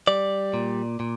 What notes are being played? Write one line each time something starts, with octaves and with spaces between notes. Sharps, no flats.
G3 D5
A#2
A#2